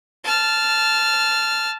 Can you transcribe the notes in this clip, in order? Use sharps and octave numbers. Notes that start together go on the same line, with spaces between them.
A5 F6